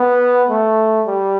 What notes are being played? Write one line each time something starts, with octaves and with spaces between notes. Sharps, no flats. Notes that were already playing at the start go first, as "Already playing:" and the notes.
Already playing: B3
A3
G3